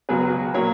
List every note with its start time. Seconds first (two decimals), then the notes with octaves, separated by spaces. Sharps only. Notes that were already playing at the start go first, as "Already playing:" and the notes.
0.09 C#2 B2 F#3 G#4 B4
0.54 A#2 F#3 A#4 C#5